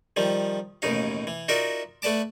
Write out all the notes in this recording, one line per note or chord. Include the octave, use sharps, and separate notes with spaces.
D#3 F3 G3
A1 D#2 B2 D#4 F5
E3
D#4 F4 F#4 A#4 D5 E5
A3 B4 D5 A5 D6